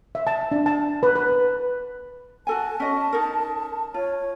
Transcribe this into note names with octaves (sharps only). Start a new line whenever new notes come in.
E5
A5
D4
A5
B4
B4
F#4 A4 G#5 A5
C#4 D#5
D#4 A4 A#4
F4 C#5